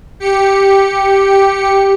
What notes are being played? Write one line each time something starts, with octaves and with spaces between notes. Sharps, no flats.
G4 C#7